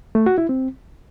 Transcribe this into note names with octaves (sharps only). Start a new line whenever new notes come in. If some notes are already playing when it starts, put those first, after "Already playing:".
A3
F#4
E4
C4